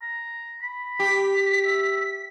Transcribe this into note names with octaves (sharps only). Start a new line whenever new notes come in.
A#5
B5
G4 B6
E5